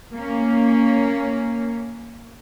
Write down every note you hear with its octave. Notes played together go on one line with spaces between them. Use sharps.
A#3 C#4